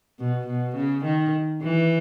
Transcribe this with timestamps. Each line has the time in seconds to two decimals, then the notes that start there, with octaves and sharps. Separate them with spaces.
0.19 B2
0.47 B2
0.76 C#3
1.05 D#3
1.62 E3